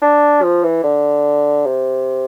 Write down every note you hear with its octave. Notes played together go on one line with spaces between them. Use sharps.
D4
F3
E3
D3
C3